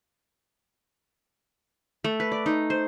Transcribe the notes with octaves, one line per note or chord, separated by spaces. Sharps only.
A3
B4
D5
D#4
C5